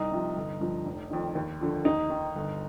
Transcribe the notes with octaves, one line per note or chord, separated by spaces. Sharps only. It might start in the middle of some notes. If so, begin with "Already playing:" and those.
Already playing: C2 D#4
C3 F3
G1
G2 F3
F1
F2 D#3
D#2
D3 F3
D#2 D#4
D#3
G1